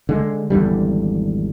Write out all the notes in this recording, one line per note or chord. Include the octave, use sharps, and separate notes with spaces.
D3 G#3
G#1 E2 D3 G3